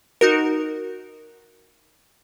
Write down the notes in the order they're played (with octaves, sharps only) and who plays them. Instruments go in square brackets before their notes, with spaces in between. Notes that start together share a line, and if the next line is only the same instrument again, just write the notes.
[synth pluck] D#4 F#4 A#4